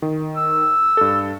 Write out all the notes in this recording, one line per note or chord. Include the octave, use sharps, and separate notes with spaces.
D#3
E6
G2 A4